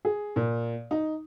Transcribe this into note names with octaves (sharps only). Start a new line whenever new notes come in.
G#4
A#2
D#4